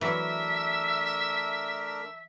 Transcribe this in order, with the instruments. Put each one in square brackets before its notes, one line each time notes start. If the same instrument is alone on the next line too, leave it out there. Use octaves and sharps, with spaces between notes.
[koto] E3 F#3 [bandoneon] A3 D4 A#4 [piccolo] E5